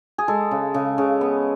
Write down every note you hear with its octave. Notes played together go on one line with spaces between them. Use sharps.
G#4
G#3 A4
C#3
C#3
C#3
B3